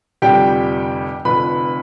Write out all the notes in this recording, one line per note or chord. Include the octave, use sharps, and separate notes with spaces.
F1 F2 D3 G3 G4 G5
F1 F2 D3 B4 B5